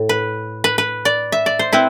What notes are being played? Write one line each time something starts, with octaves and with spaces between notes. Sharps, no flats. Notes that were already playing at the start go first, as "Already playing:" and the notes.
Already playing: A2
B4
B4
B4
D5
E5
D5
C5
C4 E4 B4